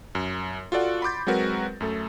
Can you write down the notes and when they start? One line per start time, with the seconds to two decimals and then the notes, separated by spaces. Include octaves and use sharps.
0.15 F#2
0.72 F4 F#4 A4 D5 F#5
1.02 B5 C6 D6 G6 A6
1.27 F#3 G#3 C4 F#4 A#4 B4
1.81 F#2 A3 A4